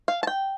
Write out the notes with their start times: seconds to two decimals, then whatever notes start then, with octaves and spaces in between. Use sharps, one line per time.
0.08 F5
0.23 A5
0.27 G5